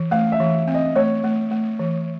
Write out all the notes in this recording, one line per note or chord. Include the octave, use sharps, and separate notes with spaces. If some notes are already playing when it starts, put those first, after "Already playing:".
Already playing: E3
A3 F5
E5
E3
C4
D#5
A3 C#5
A3
A3
E3